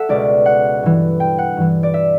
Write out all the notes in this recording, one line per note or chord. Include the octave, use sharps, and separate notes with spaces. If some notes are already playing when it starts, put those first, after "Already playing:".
Already playing: A4 E5 F#5
C#2 B2 D5
F#5
G2 E3
G5
F#5
G2 E3
D5
E5